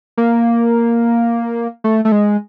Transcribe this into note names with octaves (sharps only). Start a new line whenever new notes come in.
A#3
A3
A3
G#3